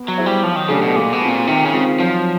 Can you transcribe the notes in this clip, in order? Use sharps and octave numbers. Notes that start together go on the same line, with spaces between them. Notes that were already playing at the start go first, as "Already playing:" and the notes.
Already playing: B3
F#3
E4 G#4 C5 E5
G3
F3 F#3
D#3
C#3 A3 D4 G4
B2
A#2 G#3
B2
C4 F4
A#2
C3 D#3
C#3
G#3 C4 F4
F3 F#3